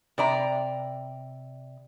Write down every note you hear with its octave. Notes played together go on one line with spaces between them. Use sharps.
C3 D5 A#5